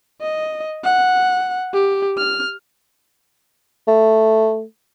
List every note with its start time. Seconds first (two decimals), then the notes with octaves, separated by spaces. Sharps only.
0.21 D#5
0.84 F#5
1.74 G4
2.18 F6
3.88 A3